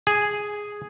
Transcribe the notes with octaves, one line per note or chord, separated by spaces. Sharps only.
G#4